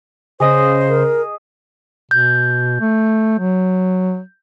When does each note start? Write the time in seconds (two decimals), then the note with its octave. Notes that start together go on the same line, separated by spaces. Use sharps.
0.40 C#3 G#4 C5 D#5 D#6
0.89 A#4
2.11 B2 G6
2.80 A3
3.39 F#3